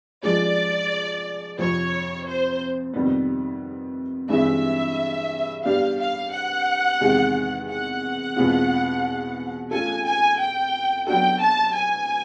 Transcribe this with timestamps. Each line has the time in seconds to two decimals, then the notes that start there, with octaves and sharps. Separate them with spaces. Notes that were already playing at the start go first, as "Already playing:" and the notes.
0.23 F3 G#3 C#4 D5
1.58 F2 C3 F3 C#5
2.26 C5
2.94 F2 C3 D#3 G3 B3
4.29 G2 E3 G#3 C4 D#4 E5
5.64 G3 B3 D4 G4 F5
5.99 F5
6.33 F#5
7.01 E2 C3 D#3 G#3
7.69 F#5
8.36 E2 B2 G#3 C4 F4
9.71 A3 C#4 F4 A4 G#5
10.05 G#5
10.39 G5
11.07 F#3 B3 D4 F#4 A4 G5
11.41 A5
11.74 G#5